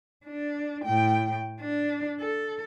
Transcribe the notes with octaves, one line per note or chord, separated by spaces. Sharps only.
D4
A2 G5
D4
A4